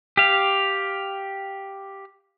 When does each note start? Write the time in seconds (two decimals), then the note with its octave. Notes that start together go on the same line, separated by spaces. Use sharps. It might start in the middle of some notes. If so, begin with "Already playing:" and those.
0.17 G4 F5